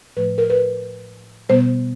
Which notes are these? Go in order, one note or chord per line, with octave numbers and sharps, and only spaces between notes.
A2 F3 A3 B4
A#4
B4
B2 G3 B3 C5